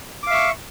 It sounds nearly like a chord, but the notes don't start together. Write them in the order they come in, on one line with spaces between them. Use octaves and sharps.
D6 F5 E5 C#6